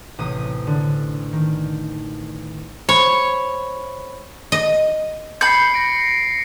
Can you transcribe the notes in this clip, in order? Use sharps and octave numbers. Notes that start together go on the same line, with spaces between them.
A1 C3 D#6
D3
D#3
C5 C#5 B5
D#5
B5 G6 C7 C#7
A#6 D7